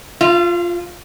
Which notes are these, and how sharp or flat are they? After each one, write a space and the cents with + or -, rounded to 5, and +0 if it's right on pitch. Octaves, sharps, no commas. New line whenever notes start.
F4 +0 F5 -40